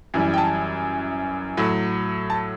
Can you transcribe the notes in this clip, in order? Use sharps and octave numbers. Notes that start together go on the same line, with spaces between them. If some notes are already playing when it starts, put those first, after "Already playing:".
F#2 E3 G3
G5
A5
A2 F#3
A5